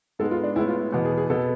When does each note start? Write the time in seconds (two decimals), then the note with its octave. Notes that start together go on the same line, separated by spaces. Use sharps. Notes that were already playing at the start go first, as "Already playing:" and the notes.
0.19 G#2 G#3 B3 A4
0.31 F4
0.44 D4
0.56 A2 G#3 B3 E4
0.68 F4
0.80 E4
0.93 E2 B2 B3
1.05 G#4
1.18 G#4
1.30 B2 B3 A4